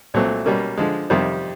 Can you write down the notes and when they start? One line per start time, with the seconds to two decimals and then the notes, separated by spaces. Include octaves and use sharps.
0.14 C2 A#2 F#3 A3 C4
0.46 B2 G3 A#3 C#4
0.77 D3 F3 G#3
1.10 F2 C3 D#3 G3 C4